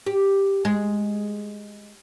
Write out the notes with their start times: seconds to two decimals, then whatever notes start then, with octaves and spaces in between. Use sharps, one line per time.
0.06 G4
0.65 G#3